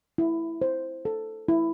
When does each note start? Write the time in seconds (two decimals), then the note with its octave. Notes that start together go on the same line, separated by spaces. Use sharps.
0.18 E4
0.62 C5
1.05 A4
1.48 E4